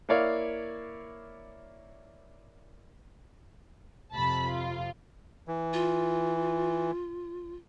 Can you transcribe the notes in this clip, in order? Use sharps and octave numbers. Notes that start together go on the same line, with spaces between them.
A#3 E4 C#5 D5 F5
F2 C3 A5 B5
F4
E3
F4